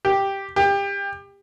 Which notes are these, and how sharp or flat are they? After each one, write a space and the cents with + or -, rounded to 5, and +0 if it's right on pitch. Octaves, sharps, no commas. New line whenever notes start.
G4 +0
G4 +25